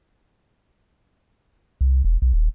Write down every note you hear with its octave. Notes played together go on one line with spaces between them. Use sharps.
C2
E1
B1
D#1